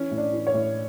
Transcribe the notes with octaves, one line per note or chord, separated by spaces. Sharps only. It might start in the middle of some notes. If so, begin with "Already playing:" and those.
Already playing: E3 C#4
A2
D4
E3
C#5
A2